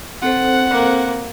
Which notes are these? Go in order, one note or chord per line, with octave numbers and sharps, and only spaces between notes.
C4 A4 C5 F#5
A#3